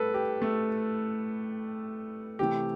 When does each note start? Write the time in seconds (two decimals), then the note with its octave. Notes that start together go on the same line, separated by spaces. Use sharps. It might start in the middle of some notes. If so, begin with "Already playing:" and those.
Already playing: A2 G3 A4 B4
0.14 G4
0.42 A3
2.39 C3 E3 A3 G4